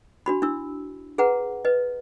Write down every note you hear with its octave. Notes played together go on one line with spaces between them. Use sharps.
D4 F#4 B5
D4 E4 E6
G#4 B4 F#5 A#5
B4 D#5